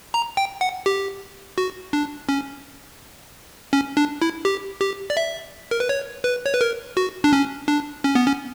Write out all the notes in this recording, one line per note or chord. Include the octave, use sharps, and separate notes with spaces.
A#5
G5
F#5
G4
F#4
D4
C#4
C#4
D4
E4
G4
G4
D5
E5
A#4
B4
C#5
B4
C#5
B4
A#4
F#4
D4
C#4
D4
C#4
B3
C#4